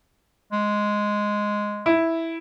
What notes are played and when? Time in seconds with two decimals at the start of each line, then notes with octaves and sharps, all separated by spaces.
0.52 G#3
1.86 E4